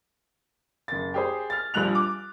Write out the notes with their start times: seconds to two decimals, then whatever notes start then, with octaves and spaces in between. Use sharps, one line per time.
0.88 F#1 A6
1.14 G4 G#4 C5
1.50 F6 A6
1.74 A#1 F3 G3 F#6 F7
1.95 D6